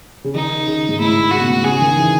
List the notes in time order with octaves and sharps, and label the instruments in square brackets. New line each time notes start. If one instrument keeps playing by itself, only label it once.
[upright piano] C#3
[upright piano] D#3 [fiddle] D#4
[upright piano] C#3
G#2
[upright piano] A2 [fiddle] E4
[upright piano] C#3 [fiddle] F#4
[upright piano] B2
A2
B2
[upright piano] C#3 [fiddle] G#4
[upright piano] D#3
E3